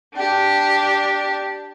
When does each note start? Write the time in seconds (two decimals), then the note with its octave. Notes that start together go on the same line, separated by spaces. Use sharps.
0.16 D4 G4